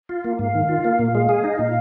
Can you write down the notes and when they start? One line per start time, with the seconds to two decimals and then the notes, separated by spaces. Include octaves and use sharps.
0.09 F4
0.24 A#3
0.39 G#2 F5
0.55 D#3
0.69 F4
0.84 A#3
0.99 A#2
1.15 G#3
1.29 G#4
1.44 D#4 D#5
1.59 A#2 F5